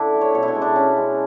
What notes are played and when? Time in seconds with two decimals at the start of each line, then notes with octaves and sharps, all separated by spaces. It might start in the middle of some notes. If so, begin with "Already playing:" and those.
Already playing: D3 D4 E4
0.14 A3
0.21 C#5
0.34 B2 C#5
0.43 E4
0.48 D4
0.55 G#3
0.62 D4
0.76 B2 C#4
0.97 G#3